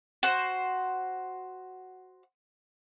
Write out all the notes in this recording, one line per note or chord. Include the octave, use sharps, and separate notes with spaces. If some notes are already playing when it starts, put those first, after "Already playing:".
F#4 C5